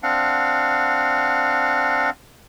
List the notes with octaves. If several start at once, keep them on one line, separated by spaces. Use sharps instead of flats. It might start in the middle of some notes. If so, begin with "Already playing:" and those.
C4 D4 F5 F#5